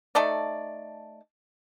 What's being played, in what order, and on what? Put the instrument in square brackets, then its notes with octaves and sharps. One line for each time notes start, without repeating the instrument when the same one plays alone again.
[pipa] A3 D#4 A4 D5